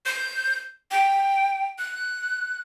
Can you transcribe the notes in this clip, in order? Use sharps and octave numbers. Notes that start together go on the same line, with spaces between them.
G6
G5
F#6